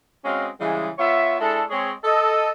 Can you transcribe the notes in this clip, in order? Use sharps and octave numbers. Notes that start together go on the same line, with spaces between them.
G#3 C4 C#4 F#4 D#5 F5
C#3 E3 G3 G#3
B3 F4 C#5 E5
G#3 D4 E4 A4
G#3 C4 G#4 C5 C#5
A4 D#5